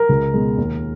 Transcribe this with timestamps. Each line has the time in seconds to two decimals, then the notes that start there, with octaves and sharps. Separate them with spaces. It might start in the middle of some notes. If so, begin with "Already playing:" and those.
Already playing: A#4
0.09 C#2
0.34 B2 G#3
0.58 D#2